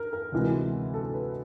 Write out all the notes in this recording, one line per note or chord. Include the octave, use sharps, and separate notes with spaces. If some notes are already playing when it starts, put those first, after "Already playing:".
Already playing: A#4
A#4
D2 C3 E3 G#3 B3
A4
B4